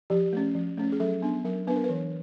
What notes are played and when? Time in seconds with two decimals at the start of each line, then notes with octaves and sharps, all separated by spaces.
0.10 F3 G4
0.33 A3 C#4
0.55 F3
0.77 A3 C#4
0.92 G#4
1.00 F#3 A4
1.22 B3 D4
1.44 F#3 A#4
1.67 B3 D4 B4
1.76 A#4
1.84 B4
1.89 E3